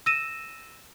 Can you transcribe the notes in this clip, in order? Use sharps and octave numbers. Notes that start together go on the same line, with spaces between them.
E6 A#6 D#7 E7